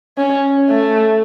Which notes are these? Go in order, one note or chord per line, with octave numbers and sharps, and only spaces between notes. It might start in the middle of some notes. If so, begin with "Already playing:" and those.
C#4
A3